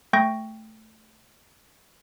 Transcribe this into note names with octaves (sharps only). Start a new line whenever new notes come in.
A3 G5 C#6 G6 A#6